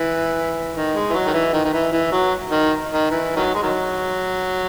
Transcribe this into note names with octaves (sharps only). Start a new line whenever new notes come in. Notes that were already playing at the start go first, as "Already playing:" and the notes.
Already playing: E3
D#3
G#3
E3
F#3
D#3
E3
D#3
D#3
E3
E3
F#3
D#3
D#3
E3
D#3 F#3
G#3
D#3 F#3